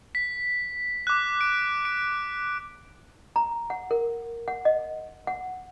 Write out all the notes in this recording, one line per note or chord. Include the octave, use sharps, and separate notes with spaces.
B6
D6 F#6
D7
D7
A#5
F#5
A#4
F#5
D#5
F#5